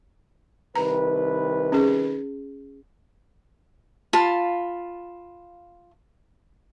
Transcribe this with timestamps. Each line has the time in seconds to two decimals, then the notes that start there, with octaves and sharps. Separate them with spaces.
0.76 C2 D#3 B4 A#5
1.72 C#4 G#4
4.13 F4 F5 A5 B5